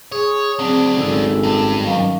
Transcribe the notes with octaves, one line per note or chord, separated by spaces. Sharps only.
G#4 C#5 D#6
F#3 C4 D4 G#4
G#1 C#4 A4 E6
G2
D#3 F#3 C#4 F5